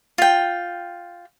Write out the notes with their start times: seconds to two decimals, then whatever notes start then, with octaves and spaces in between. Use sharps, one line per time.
0.18 F4 G5